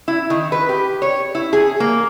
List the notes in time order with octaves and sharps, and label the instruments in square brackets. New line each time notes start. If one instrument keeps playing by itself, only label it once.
[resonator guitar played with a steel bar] E4
D#3
B4
G4
C#5
E4
G#4
A#3